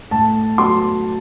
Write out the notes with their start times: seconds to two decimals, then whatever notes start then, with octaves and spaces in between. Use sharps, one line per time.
0.11 A2 A5
0.58 F#3 C6